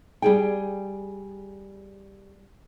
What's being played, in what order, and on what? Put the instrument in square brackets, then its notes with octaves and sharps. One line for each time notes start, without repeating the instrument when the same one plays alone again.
[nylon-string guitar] G3 G#4 G5